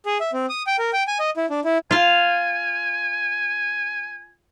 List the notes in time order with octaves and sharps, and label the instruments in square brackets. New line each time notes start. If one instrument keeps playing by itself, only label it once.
[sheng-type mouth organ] G#4
E5
C4
D#6
G5
A#4
G5
G#5
D#5
E4
D4
E4
[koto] F4 F5 [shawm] G#5